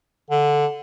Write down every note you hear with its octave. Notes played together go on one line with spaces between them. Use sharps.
D3